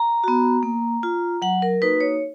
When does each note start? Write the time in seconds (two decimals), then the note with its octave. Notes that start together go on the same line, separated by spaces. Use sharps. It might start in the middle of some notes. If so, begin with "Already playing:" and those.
Already playing: A#5
0.24 B3 F#4
0.63 A#3
1.03 F4
1.42 F#3 F#5
1.62 A#4
1.81 A#3 D#4 F#4 B4
2.01 C#5